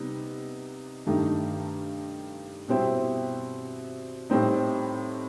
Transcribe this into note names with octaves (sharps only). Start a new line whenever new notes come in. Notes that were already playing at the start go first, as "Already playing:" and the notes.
Already playing: C3 G3 B3 D#4
G2 D#3 A3 D#4
B2 G3 C4 E4
A2 G3 C4 D#4